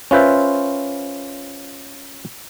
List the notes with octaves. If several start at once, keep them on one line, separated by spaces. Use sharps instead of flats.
C#4 F4 B4 C5 E5